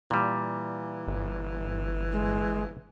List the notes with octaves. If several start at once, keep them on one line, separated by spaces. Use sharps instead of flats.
A#2 E3 G3
G1
G#3